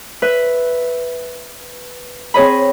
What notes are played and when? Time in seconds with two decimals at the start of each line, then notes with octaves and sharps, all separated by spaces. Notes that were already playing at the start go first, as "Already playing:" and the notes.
0.22 B4 E5
2.34 C4 G#4 C#5 D#5 B5